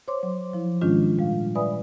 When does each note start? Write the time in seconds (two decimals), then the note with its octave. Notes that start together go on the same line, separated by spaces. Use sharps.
0.08 C5 C#5 C6 D6
0.23 F#3
0.53 F3 E4
0.81 G#2 D#3 G#3 C#4 D4 F4
1.18 A#2 G3 F5
1.55 B4 D5 E5 G#5 B5 D#6